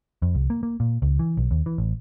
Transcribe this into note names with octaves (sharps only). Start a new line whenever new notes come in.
F2
C2
A#3
A#3
A#2
C#2
E3
B1
D#2
E3
A1